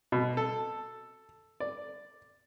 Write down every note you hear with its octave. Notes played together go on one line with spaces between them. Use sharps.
B2
A4
D5